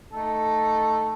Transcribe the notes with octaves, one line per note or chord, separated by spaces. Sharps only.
A3 D#4 A4